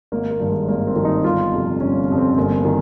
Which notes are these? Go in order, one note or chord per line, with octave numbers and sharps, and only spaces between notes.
G#1 A#3
A#3
G2 D#3
G#3
G#1 A#3
C4
G2 D#3
D#4
G1 F4
F2 C3
G1 C#4
F2 C3
C4
G1 A#3
D#3